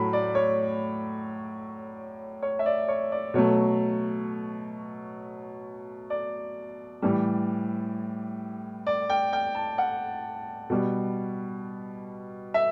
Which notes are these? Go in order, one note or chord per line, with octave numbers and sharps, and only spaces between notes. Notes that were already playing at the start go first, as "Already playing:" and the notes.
Already playing: A2 F#3 A3 B5
D5
C#5
C#5
E5
D5
C#5
D5
B2 F#3 A3 C#5
D5
A2 E3 G3
D5
G5
G5
A5
F#5
B2 G3
E5